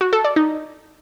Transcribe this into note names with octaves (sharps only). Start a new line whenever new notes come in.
F#4
A4
D5
D#4